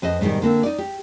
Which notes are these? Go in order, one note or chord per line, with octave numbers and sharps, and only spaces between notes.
F2 B4 C5 D#5
G#2 B2 D3 D#3 G3
D3 A#3 C4
D#4 D5
G4